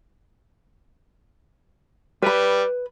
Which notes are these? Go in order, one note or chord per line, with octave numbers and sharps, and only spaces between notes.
G3 B4 B5